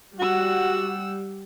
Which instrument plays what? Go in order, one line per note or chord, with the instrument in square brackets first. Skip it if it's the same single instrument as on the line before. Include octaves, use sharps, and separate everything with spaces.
[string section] G3 [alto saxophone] F#4 [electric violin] F#5 E6